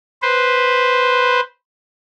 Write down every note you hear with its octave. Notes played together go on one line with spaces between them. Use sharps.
B4 C5